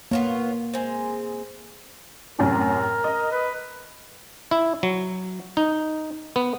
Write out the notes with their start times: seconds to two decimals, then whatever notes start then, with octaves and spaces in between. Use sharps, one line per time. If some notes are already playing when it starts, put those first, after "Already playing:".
0.11 A#3 B3 F4 C#5
0.74 G#3 C4
2.39 F#2 A2 C3 A#4
3.04 D#5
3.32 B4
4.51 E4
4.83 F#3
5.57 D#4
6.36 B3